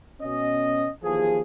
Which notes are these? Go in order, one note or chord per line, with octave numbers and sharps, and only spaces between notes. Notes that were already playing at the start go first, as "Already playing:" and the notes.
B2 C#4 D#5
D#2 E3 F3 G#4